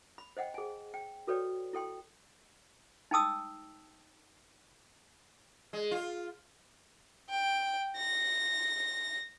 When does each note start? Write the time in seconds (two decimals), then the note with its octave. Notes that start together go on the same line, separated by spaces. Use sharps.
0.18 B5
0.37 C5 D#5 F#5 G5
0.54 G#4 G#5
0.94 G5
1.27 F#4 A4 B4 C#5 D5 G5
1.73 E4 A4 G5 C6
3.11 D#4 G5 A5 D#6 E6
5.73 G#3
5.91 F4
7.30 G5
7.97 A#6